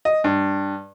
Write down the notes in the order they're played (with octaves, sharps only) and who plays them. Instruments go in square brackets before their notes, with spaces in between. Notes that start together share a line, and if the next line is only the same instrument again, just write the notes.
[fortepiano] D#5
G2